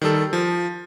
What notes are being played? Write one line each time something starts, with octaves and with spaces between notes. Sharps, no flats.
D#3 G3 A4
F3